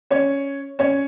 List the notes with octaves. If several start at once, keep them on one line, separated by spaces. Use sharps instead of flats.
C#4 C#5
C#4 C#5